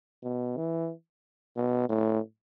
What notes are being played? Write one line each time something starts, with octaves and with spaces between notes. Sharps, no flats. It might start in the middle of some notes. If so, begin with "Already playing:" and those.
B2
E3
B2
A2